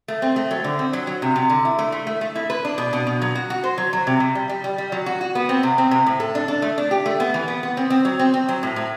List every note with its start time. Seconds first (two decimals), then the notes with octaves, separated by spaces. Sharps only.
0.08 A3
0.22 C4
0.36 A3
0.51 F#3
0.64 D3
0.79 C4
0.93 F#3
1.07 F#3
1.22 C3
1.36 C3
1.50 D3
1.65 E4
1.79 A3
1.92 A3
2.07 A3
2.21 A3
2.36 E4
2.50 B4
2.65 D4
2.78 B2
2.93 B2
3.07 B2
3.22 F#3
3.35 F#4
3.50 F#4
3.64 C5
3.78 F#3
3.93 F#3
4.07 C3
4.20 C3
4.35 G3
4.49 G3
4.64 G3
4.78 G3
4.92 F#3
5.06 F#4
5.21 F#4
5.35 B3
5.49 C4
5.63 C3
5.78 C4
5.91 C3
6.06 A2
6.20 A4
6.35 D4
6.48 D4
6.62 A3
6.78 D4
6.91 G4
7.06 A3
7.20 B3
7.34 E3
7.48 B3
7.63 B3
7.77 C4
7.90 C4
8.05 F#3
8.19 C4
8.34 C4
8.48 F#3
8.63 A2
8.76 A2